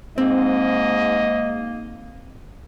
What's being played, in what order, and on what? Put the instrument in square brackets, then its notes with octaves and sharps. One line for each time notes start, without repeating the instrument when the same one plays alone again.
[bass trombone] G#2 [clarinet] A#3 [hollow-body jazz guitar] C4 [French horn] D#5